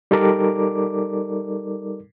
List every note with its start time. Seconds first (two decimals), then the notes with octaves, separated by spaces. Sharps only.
0.11 G3 D#4 A4 A#4 D5 D6